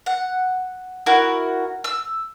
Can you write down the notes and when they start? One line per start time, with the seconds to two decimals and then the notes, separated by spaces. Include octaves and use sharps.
0.06 F#5
1.06 E4 F#4 A#4
1.84 E6